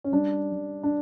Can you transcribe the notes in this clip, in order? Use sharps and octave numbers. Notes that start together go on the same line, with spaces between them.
C#4
G3 D4
G3
D4